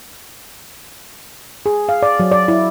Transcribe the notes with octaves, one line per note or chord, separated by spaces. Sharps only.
G#4
F5
D5
F#3
D5
E4